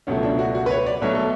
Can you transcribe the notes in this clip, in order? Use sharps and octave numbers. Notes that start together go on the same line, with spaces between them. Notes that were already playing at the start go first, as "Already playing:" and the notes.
C#2 B2 F#3 A3 C#4
D4
F#4
F#4
B4
C#5
D5
B1 B2 A3 C#5
A4